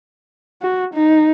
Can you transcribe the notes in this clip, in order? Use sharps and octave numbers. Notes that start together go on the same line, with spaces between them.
F#4
D#4